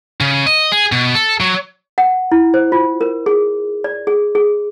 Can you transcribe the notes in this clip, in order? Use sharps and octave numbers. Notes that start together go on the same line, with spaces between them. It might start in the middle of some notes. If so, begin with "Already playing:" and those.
C#3
D#5
G#4
B2
A4
F#3
F#5
E4
C5
F4
A#4
G#4
D5
G#4
G#4